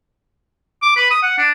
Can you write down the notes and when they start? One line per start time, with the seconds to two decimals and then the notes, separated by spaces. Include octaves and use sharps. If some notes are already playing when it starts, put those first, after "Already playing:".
0.82 D6
0.96 B4
1.11 D#6
1.23 F#5
1.38 D4